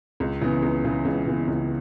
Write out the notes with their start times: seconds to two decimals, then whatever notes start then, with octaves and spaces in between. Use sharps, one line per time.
0.20 C#2
0.41 C#3 E3 B3
0.62 C#2
0.84 C#3 E3 B3
1.05 C#2
1.26 C#3 E3 B3
1.48 C#2